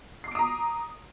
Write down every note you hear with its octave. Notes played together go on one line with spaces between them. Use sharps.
A#5 D6 D#6 C7 D7